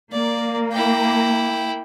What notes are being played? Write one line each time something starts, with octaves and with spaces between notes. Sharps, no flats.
A#3 D5
E4 G5